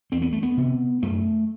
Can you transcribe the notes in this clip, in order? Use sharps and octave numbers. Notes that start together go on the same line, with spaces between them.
E2 C4
B3
A3
B3
C3
F#2 A3